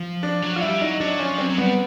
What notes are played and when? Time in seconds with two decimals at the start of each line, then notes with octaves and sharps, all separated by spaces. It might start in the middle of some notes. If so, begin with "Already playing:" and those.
Already playing: F3
0.23 D4
0.42 F#3
0.56 F4
0.61 G3 E4
0.81 F#3 D#4
1.00 F#3 D4
1.19 F3 C#4
1.38 F#3 C4
1.50 F#3
1.58 G3 B3